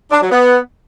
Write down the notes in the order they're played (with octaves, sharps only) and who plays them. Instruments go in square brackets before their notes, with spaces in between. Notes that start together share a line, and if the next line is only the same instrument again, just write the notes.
[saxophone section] D4
F#3
B3